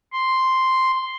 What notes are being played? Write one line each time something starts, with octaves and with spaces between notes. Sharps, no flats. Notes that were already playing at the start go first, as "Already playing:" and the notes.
C6